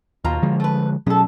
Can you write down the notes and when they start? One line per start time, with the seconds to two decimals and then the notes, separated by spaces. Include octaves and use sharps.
0.24 D#2 B2 F4 A#5
0.42 D3 F3 G#3
0.60 A3 B4
1.06 B2 F#3 C#4 G#4 A4